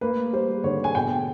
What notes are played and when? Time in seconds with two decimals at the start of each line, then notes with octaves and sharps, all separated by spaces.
0.01 A#3 B4
0.33 G3 C5
0.64 D3 C#5
0.84 G#5
0.95 B2 G5